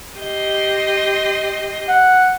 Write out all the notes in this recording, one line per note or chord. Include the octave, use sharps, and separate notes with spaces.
G4 D#5 C6
F#5